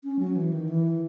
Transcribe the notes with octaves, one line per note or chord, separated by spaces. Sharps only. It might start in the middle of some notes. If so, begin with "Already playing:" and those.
C#4
F#3
E3
D#3
E3